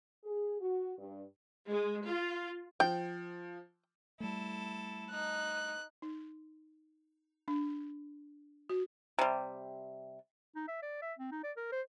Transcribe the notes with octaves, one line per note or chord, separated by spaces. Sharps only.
G#4
F#4
G2
G#3
F4
F3 G5
G3 A3 E4 A4
D#4 F#6
D#4
D4
F#4
C3 G3
D#4
E5
D5
E5
C4
D#4
D5
A#4
C5